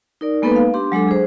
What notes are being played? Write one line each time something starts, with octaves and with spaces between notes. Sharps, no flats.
D#4 A#4 D5
G#3 A#3 B3 D#4 A4 B4
F5
D4 G4 C6
F#3 G#3 D4 A4
G#4 C5